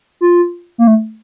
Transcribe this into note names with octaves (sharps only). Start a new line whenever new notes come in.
F4
A#3
A3